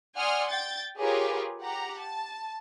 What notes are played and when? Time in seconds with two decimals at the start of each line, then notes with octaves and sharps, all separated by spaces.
0.17 D5 F#5 G#5 C6 D#6 F6
0.49 G5 G6 A6
0.99 F4 G4 G#4 A#4 B4 C#5
1.61 G4 F#5 A#5
2.00 A5